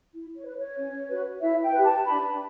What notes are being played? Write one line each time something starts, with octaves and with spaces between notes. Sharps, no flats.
E4
C#5
B4
C#5
C#4
F#4 B4
E4 E5
G5
G4 B4
A5
D4 B5